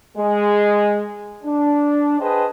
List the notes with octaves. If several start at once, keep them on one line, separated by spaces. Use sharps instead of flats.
G#3
D4
G#4 B4 C5 D#5 G5 A5